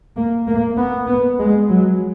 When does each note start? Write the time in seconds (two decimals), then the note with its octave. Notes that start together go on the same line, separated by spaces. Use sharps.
0.16 A#3
0.48 A#3
0.77 B3
1.07 B3
1.38 G#3
1.69 F#3